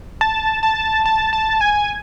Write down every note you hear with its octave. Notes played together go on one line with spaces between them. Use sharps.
A5
A5
A5
A5
G#5